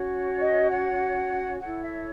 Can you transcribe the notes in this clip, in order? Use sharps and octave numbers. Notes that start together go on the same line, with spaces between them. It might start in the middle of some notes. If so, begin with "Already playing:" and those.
Already playing: C#4 F#4 C#5
D#5
F#5
E4 A4 C#5 F#5
E5